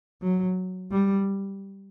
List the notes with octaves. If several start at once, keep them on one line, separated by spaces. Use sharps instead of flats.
F#3
G3